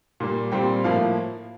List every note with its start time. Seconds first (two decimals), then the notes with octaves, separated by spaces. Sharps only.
0.20 A#2 G3 A#3
0.52 A#2 G3 C4 G5
0.84 A2 F3 A#3 F5